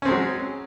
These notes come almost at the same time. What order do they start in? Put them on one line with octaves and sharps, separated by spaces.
C#4 C4 G#3 F#3